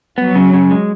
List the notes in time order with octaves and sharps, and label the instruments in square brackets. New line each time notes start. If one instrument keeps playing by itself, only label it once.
[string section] F#3 [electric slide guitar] B3
[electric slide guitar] C#3
C#3
G#3